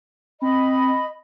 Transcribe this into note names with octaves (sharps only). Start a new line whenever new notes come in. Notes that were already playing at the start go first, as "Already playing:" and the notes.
C4 D#5 B5